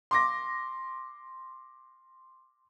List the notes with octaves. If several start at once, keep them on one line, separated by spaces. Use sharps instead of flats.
C6 D6 A#6